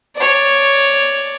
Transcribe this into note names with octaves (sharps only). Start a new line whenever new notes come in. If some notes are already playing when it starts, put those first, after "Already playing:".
C#5 D5